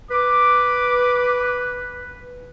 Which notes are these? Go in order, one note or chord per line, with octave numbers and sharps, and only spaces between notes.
B4 D6